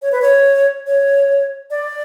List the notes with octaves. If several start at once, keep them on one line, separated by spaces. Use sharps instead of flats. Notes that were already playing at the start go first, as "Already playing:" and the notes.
C#5
B4
C#5
C#5
D5